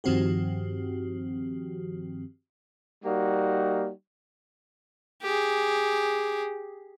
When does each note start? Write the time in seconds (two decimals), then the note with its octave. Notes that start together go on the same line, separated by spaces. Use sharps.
0.04 G2 D#3 F3 C4 F#4 G4
3.03 G3 A#3 D#4 F#4
5.22 G4 G#4